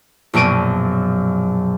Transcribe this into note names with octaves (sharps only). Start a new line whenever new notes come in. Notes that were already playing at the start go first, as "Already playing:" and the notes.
A#1 F#2 B2 D7 D#7